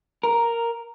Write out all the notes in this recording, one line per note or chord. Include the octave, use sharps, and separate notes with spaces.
A#4